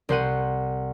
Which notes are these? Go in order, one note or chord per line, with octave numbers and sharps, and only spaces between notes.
C2 C5 F#5 D#7